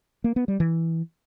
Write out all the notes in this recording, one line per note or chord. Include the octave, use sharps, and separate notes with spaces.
A#3
B3
G3
E3